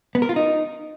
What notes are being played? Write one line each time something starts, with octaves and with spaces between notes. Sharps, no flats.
B3
A#4
F4
D#4